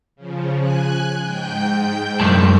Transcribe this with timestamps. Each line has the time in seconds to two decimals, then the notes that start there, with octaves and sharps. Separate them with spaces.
0.16 C#3 F3
0.60 G#5 F#6
1.21 G#2 G5 G6
2.20 F#2 A2 G3 A5